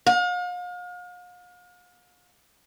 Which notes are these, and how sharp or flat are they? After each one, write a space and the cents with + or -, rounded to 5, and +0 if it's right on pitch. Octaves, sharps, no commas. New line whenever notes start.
F5 +40